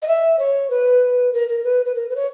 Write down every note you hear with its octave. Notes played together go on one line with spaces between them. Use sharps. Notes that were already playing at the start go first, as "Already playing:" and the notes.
D#5
E5
C#5
B4
A#4
A#4
B4
B4
A#4
B4
C#5